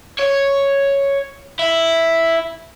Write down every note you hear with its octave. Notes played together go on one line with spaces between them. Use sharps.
C#5
E4